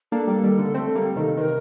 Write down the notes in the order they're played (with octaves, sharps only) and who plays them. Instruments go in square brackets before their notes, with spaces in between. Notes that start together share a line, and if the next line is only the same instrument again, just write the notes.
[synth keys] A#3 D4 [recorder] A4
[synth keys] G3 A#3
D#3 G3
D3
A3 C4
A3
G3 A#3
C3 D#3
[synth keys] C3 D#3 [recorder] C5
[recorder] A#4